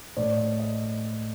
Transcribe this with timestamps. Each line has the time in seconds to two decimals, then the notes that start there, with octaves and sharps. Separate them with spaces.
0.17 A2 D5
0.37 D#5
0.60 D#5